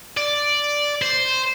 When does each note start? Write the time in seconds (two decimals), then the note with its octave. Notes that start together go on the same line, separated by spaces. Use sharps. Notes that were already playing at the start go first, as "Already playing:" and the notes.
0.17 D5
1.02 C5